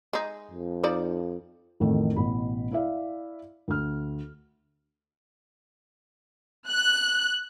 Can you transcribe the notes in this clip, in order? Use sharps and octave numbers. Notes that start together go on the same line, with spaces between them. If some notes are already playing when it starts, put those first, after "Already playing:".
G#3 D#4
F2
F3 D#4 D5
A1 F2 D#3 A3
A1 B2 B5
E4 D5 E5 F5
D2 F6
F#6